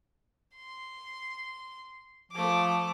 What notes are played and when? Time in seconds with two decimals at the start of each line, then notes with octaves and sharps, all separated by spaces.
0.55 C6
2.32 F3 A3 D6